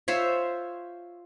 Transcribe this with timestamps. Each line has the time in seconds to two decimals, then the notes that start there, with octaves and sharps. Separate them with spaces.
0.08 F4 C5 C#5 E5